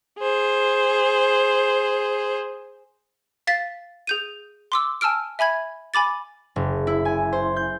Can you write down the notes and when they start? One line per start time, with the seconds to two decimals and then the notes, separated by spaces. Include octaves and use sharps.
0.19 G#4 C5
3.47 F5 A6 B6
4.07 G#4 G6 D#7
4.72 C6 D6 E6
5.01 G#5 A5 E6 F6 D7
5.39 E5 G#5 B5 G#6
5.94 G#5 B5 D6 A6
6.56 F#1
6.87 E4
7.05 G#5
7.33 C5
7.56 G6